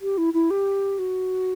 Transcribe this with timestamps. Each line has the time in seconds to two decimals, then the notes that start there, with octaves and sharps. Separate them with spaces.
0.01 G4
0.18 E4
0.34 E4
0.51 G4
0.99 F#4